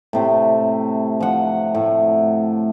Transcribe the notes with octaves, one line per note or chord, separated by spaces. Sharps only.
A2 C3 A3
F3 F#5
A2